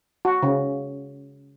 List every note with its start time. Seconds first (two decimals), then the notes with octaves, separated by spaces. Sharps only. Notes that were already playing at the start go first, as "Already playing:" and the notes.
0.25 F#4
0.42 C#3